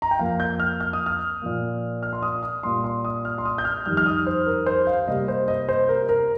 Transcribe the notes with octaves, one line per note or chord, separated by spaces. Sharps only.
A#5
G5
F2 F3 A#3 F5
G6
F6
F6
D#6
F6
A#2 F3 A#3
F6
C6
D#6
D#6
A#2 G3 A#3 C6
C6
D#6
F6
C6
D#6
G6
F6
F2 D#3 G3 F6
F6
D#6
C5
A#4
C5
F5
C3 G3 A#3 D#5
C5
D#5
C5
A#4
A#4